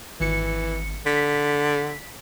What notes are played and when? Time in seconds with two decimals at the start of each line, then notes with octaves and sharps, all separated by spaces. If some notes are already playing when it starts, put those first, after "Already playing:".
0.20 G#1 E3 C#7
1.06 D3 B6